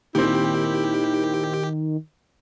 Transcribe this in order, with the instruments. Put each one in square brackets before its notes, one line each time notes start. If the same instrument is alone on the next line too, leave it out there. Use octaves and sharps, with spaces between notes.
[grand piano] A#2 C4 [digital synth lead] D#3 [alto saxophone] E4 [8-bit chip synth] G4